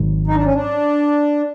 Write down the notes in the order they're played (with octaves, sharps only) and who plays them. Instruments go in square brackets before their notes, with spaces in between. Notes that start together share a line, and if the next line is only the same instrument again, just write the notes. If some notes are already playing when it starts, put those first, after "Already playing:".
Already playing: [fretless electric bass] G#1 G#2 D#3 F#3
[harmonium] D#4
D4
C#4
D4